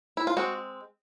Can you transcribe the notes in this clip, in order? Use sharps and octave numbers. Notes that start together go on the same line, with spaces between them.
E4
F4
G#3 C4 F#4